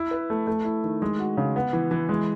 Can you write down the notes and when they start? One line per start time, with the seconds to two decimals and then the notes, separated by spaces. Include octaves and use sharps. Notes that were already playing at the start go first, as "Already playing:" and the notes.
Already playing: E4
0.11 B4
0.30 A3
0.47 A3
0.65 E4
0.84 D#3
1.02 G#3
1.19 F#4
1.37 C#3
1.56 B3
1.73 E3
1.91 E3
2.09 G#3